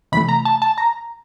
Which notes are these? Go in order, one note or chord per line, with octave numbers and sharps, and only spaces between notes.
C3 E3 A3 B5
A#5
A5
A5
A#5